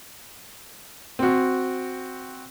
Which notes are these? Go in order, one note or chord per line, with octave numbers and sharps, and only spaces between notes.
C4 F#4